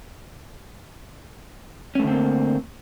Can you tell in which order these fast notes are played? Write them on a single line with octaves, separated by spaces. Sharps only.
C#4 A3 D3 C4 A#3